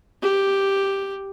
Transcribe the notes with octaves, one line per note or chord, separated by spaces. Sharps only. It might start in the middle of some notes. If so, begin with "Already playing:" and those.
G4